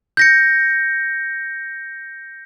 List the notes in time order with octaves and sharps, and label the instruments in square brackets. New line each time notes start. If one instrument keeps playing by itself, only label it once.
[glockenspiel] G6 A#6 C#7